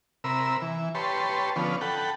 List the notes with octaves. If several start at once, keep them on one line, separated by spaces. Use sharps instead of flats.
C3 A#4 B5 E6
E3
G4 B4 C#5 A5 C6
D3 F3 B3 C#4
A4 F#5 G5 B5